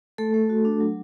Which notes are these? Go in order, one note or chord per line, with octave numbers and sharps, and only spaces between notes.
A3 A4
A3
F#4
D4
F#3